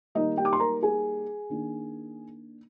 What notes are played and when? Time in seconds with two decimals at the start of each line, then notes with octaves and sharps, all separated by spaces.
0.15 D#3 G3 A#3 D#4 D#5
0.37 G4 G5
0.45 D6
0.53 C6
0.60 A#4 A#5
0.82 G#4 G#5
1.50 D#3 A#3 D4